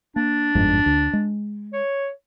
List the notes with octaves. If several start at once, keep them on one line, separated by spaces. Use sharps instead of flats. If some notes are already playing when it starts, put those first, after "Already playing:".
A#3 D4
G1 F2 G#2
D2
G#3
C#5